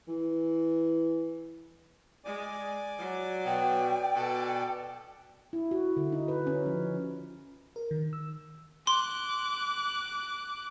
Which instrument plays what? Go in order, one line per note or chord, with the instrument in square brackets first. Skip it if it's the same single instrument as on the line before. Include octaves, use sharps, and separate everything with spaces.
[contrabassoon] E3
[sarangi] G#3 [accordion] D5 G#5 D6
[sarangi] F#3
[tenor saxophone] B2 [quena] G5
[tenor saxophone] B2 [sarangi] A4
[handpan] E4
F#4
D3
D#4
B4
C#4
F3
[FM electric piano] A#4
D#3
E6
[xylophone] C6 [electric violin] D6 F#6